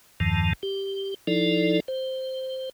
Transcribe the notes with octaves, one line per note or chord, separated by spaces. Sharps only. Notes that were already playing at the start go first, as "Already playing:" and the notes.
E2 G2 D#3 F3 A5
G4
F3 D#4 E4 A4 D5
C5